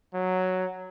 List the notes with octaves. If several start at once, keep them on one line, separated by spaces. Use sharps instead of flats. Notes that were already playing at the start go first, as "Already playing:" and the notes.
F#3